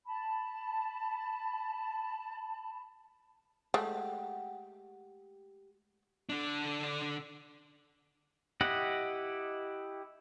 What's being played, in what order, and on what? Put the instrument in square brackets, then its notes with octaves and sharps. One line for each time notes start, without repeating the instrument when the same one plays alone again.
[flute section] A5 B5
[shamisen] G#3 A3 [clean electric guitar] G4 F#5
[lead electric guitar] D3 D4
[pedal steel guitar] E4 G4 D#5 F#5